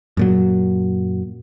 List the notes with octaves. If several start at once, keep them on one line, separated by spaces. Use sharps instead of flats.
F#2 A#2 F#3